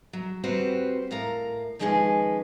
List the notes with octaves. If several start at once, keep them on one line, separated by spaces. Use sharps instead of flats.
F#3
G3 C4 F#4 G4 B4 C5
A2 A#4 F5 A#5
D#3 F3 G#3 C#4 G#4 B4